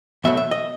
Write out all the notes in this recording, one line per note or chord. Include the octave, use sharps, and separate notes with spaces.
E2 B2 F#3 A3 E5
E5
D#5